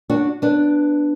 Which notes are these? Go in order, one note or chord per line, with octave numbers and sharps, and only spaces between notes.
D4 F#4
B3 D4